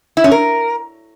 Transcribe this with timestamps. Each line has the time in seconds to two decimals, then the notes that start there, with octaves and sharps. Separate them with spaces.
0.17 E4
0.24 C#4
0.31 A#4